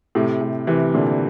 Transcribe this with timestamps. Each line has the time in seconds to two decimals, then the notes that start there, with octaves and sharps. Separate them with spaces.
0.15 A2 C3
0.41 A2 C3
0.67 C3 E3
0.94 A#2 D3